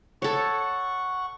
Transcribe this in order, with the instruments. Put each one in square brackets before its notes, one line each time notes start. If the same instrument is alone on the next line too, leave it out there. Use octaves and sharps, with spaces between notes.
[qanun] A4 C#5 [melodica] F#5 C#6